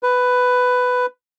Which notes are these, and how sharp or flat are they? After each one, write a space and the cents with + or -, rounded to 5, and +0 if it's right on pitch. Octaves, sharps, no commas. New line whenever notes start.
B4 +10